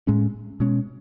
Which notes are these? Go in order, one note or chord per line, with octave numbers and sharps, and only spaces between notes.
A2 G#3 C#4
B2 G#3 C#4